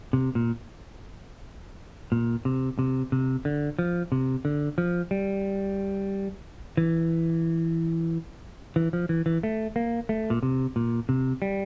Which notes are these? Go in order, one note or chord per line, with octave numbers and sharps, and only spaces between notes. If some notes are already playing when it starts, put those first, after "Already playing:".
C3
A#2
A#2
C3
C3
C3
D3
F3
C3
D3
F3
G3
E3
E3
F3
E3
E3
A3
A#3
A3
A#2
C3
A#2
C3
G3